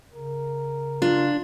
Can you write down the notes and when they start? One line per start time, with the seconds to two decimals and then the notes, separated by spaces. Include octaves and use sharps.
0.14 C#3 A#4
1.02 D4 F4